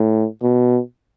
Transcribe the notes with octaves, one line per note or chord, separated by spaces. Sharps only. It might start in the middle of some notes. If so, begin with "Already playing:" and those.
Already playing: A2
B2